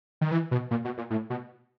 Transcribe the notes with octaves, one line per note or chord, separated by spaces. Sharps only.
D#3
E3
B2
A#2
B2
A#2
A2
B2